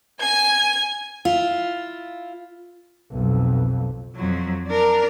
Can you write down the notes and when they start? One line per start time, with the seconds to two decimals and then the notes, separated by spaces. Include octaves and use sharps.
0.21 G#5 G#6
1.25 E4 F4
3.12 B1 F2
4.16 F2 F#3
4.68 D4 A#4